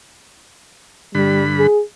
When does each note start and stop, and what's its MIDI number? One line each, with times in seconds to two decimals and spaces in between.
1.15 1.67 43
1.15 1.67 50
1.15 1.42 55
1.15 1.67 83
1.58 1.81 68